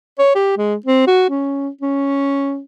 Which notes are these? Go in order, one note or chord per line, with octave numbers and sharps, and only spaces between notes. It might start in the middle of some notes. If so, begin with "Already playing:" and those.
C#5
G4
G#3
C4
F#4
C#4
C#4